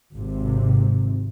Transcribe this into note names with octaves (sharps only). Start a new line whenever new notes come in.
G#1 C3